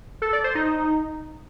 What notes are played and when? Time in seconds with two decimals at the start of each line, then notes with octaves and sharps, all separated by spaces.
0.22 A4
0.33 D5
0.44 C5
0.55 D#4